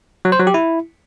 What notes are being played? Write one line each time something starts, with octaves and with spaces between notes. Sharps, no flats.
F#3
C5
F#3
G4
E4